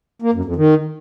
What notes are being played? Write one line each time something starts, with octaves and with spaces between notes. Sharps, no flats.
A#3
F#2
F2
D#3